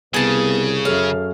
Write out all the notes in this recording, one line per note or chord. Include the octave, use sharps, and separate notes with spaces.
C2 C#3 B3 G#4 A5
F#2 A4 C#5 F5